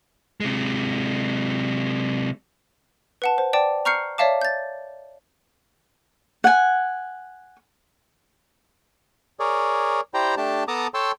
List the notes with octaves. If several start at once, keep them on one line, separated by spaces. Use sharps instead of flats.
C3 G#3
B4 F#5 A5
C5
D5 G5 A5 D6
A#5 C#6 F6 G6 C7 C#7
C#5 D5 E5 F5 A5 D6
G6 A6
F#5 G#5
G#4 A#4 C#5 D5
E4 G4 C5 D5 G5 A#5
A3 D4 G4 A5
B3 A4 A5 A#5 D6 D#6
A4 C#5 G5 A5 C6 E6